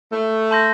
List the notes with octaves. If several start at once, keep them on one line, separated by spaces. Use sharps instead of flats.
A3
A5 C6 G6 A#6